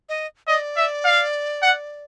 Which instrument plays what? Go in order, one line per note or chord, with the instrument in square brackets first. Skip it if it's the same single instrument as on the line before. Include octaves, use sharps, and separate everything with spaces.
[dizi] D#5
[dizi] D5 [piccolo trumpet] D#5
[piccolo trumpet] E5
F5
F#5